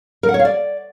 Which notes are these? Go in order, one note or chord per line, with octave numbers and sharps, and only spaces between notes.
A#4
F#5
C#5
F5
D5